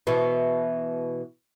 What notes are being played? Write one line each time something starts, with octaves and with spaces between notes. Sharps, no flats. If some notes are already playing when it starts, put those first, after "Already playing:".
B2 E3